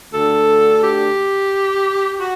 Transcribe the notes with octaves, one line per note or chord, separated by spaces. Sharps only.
D2 D3 A4
G4
F#4